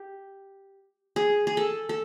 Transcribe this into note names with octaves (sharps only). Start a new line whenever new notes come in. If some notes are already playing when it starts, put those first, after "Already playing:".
Already playing: G4
G#4
G#4
A4
A4